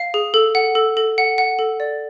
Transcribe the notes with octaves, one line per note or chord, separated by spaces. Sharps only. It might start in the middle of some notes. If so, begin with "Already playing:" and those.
Already playing: F5
G#4
A4
F#5
A4
A4
F#5
F#5
A4
D5